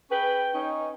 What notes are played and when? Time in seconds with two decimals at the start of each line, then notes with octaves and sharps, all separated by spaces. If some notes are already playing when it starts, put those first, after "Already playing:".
0.10 C#4 G#4 B4 G5
0.54 C#4 D#4